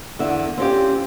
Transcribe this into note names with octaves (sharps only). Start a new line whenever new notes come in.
E2 D3 E5
C4 C#4 F4 G4